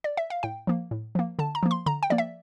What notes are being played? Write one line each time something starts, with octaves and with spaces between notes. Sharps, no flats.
D5
E5
F5
A2 G5
F3 A#3
A2
F3 A#3
D3 A5
A#5
F3 A#3
C6
D3 A#5
G5
F3 A#3 D5
E5